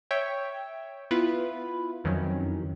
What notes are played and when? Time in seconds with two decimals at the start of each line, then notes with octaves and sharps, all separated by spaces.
0.11 C#5 E5 G5
1.11 B3 E4 F4 B4
2.04 F2 D#3 E3 F#3 C#4